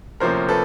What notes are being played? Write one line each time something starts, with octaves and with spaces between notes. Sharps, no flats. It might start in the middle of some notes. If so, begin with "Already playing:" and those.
D2 C3 F3 A#3 C#4 A#4 C5
A4 B4